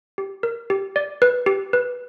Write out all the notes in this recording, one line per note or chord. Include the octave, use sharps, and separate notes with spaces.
G4
A#4
G4
D5
B4
G4
B4